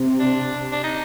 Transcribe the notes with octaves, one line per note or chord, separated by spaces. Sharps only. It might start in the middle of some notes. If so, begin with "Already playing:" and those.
Already playing: C3
D4
D4
D#4